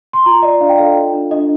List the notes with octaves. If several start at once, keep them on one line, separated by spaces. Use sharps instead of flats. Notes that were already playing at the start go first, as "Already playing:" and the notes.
C6
F4 A#5
D5 D#5
D4 F5
G5
A4 F5
F4
D4
D4 D#5